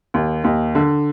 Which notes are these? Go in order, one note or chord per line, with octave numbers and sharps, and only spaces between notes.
D#2
D#2
D3